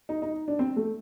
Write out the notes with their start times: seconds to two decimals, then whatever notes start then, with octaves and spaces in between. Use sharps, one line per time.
0.09 D#4
0.22 D#4
0.48 D4
0.59 C4
0.76 A3